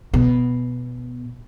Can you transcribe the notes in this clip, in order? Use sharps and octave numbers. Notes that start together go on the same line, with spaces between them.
B2